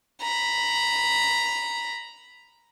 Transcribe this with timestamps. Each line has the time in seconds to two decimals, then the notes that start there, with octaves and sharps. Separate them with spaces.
0.22 A#5 B5